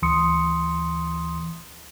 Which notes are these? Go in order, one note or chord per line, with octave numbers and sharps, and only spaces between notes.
D2 E3 C6 D#6 C#7